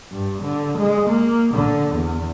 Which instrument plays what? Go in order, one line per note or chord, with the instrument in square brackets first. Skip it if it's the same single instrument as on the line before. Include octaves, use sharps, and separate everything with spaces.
[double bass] G2
D3
G#3
A#3
D3
E2